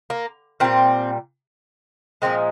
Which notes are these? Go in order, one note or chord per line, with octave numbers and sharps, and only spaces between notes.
A#3
A#2 G3 C4
A#2 F3 G#3 C4